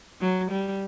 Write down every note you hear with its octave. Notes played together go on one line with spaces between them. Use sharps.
F#3
G3